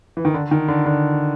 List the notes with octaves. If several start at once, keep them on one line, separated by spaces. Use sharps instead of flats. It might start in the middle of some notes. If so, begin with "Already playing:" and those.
E3
D#3
D3
D#3
D3
D3